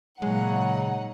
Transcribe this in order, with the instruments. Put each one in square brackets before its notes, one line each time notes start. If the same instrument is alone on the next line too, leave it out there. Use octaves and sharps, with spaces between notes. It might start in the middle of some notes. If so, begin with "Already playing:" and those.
[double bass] A#2 [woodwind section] C#3 F#3 [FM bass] G#3 [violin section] D#4 F#5